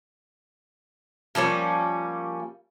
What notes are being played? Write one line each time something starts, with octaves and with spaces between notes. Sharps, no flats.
F3 G3 A#3 C#4